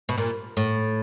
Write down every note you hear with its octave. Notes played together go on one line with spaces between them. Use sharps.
B2
A#2
A2